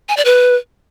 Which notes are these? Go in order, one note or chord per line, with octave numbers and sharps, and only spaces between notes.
G#5
D5
B4